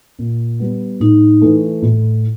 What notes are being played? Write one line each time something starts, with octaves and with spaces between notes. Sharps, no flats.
A#2
G3 B3
A2 D#4
E3 A3
A2